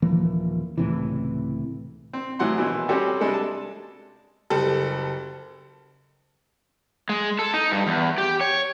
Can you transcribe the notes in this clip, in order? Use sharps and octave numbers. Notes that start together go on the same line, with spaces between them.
D#1 E3 F3 A#3
C#2 A2 C3 E3
C4
A2 E3 F#3 F#5 C6
A#1 B2 E3
G3 C4 C#4 F#4 G4 A4
C3 G3 G#3 D4 A4
A5
F#1 G3 A4
G#3
A4
D#4
G2
E2
G4
C#5